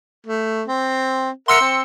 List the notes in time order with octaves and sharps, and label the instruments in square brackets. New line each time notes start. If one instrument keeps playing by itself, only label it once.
[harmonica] A3
C4
[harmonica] A#4 E5 F#5 [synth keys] C6 E6 C#7
[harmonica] C4